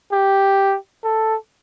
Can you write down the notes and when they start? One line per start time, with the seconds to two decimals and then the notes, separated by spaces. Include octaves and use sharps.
0.12 G4
1.04 A4